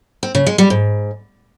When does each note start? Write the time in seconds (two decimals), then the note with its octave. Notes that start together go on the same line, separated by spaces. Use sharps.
0.23 C4
0.35 C#3
0.46 G#3
0.58 G3
0.70 G#2